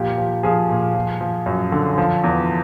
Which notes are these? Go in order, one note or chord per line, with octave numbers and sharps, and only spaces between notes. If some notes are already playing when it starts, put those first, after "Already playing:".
Already playing: A#2 F3 G4
F3
F3 G#4
A#2
F3
F3
F#2
D3
F3
E2